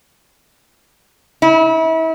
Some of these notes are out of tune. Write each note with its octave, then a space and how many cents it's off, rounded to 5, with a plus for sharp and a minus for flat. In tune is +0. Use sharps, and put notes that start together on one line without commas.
E4 -35